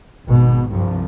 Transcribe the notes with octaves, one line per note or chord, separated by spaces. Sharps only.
G#1 B2
C2 G2 F3